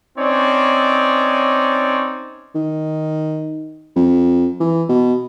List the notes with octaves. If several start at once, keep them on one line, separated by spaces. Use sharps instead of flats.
C4 C#4 D#4 C#5 D5
D#3
F2
E3
B2